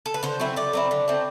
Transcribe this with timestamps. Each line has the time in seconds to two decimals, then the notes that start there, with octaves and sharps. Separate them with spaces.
0.06 A4
0.14 B4
0.23 D3 C5
0.40 F#3 C4 E4 E5
0.56 D3 D5
0.73 F#3 C4 E4
0.91 D3
1.08 A3 C4